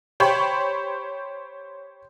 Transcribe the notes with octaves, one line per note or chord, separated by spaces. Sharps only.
G4 C5 C#5 G5 B5 C6